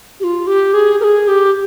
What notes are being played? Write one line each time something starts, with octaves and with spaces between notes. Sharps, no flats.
G4
F4
G4
G#4
A#4
G#4
G4